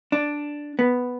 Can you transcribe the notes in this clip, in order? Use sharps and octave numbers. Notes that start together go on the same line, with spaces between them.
D4
B3